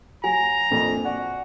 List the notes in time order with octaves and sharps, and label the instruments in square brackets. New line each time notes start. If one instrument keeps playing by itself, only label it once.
[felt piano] F#3 [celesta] G#5 [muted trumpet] A#5
[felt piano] A#1 F2 A#2
[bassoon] F#4 [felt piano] D5